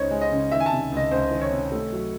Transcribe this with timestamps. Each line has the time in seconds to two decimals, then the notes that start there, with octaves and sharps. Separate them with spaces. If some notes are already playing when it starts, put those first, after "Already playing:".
Already playing: C#2 C#3 G#3 D#4 C5 C#5
0.11 G#3
0.21 D#5
0.32 C#3
0.51 D#3 E5
0.60 G#5
0.66 A5
0.71 C3
0.92 C#2 D#5
1.11 C#2 C5
1.31 D#3
1.41 C#5
1.51 C3
1.71 A3
1.92 F#3